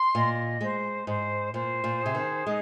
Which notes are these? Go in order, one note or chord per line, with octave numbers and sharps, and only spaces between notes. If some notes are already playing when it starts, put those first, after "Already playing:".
Already playing: C6
A#2 D#5
G#3 C5
G#2 C5
A#2 C5
A#2
G#4
C3
D#3
G#3 D#4